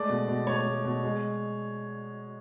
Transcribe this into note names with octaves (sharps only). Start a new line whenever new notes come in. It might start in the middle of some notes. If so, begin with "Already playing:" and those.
Already playing: G#3 A3 D5
B2
B2
A3 C#5
A3
B2
G#3